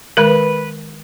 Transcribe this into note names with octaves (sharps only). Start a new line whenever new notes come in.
D#3 G#3 A#4 B4